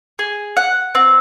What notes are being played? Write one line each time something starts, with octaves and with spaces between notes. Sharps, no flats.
G#4
F#5
C4